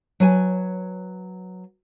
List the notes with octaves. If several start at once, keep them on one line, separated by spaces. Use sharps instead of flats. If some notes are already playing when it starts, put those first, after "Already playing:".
F#3 B4 G#5